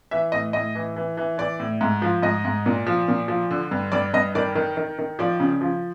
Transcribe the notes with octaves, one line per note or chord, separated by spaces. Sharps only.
E3 E5
A2 D#5
A2 D#5
E3
E3
E3
E3 D5
A2
G#2
F3
G#2 D#5
G#2
A#2
F3
A#2
F3
D3
G2
G2 D5
G2 D#5
D#3 D5
D#3
D#3
D#3
F3 D5
C#3
F3